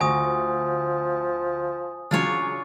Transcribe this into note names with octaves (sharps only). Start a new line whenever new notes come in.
D2 F3 G#5 C#6 D#6 A#6
C#3 F#3 D4 F4 C#5